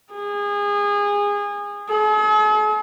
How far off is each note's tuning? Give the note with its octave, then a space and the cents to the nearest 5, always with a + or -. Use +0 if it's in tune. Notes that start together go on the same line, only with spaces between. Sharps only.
G#4 -25
G#4 +45